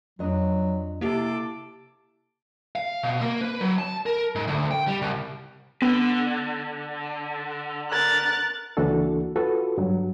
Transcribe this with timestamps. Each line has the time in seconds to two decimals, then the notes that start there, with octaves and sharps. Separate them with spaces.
0.19 F2 F#3 D4 D#5
1.01 C3 A#3 E4 G4 A4 F5 D6
2.75 F5
3.03 B2
3.21 A#3
3.41 B4
3.61 F#3
3.78 A5
4.06 A#4
4.35 G#2
4.47 D2
4.71 G5
4.87 G3
5.02 C2
5.82 D3 B3
7.89 A#4 F#6 A6
8.77 C#2 E3 A#3 D4 F#4 A4
9.36 F4 F#4 A4 B4
9.78 G2 F#3